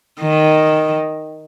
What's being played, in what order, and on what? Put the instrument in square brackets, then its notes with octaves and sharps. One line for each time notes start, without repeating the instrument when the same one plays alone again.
[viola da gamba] D#3